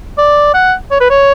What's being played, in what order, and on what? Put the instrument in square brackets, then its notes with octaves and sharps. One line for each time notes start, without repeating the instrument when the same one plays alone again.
[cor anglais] D5
F#5
C#5
B4
C#5